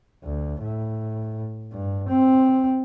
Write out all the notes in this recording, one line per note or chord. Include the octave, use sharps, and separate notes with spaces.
D2
A2
G2
C4